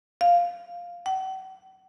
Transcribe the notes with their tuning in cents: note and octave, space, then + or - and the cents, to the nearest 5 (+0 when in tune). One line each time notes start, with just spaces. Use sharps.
F5 +0
F#5 +45